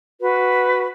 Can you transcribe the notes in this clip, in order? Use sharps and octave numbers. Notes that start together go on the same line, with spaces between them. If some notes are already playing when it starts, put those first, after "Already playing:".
F#4 B4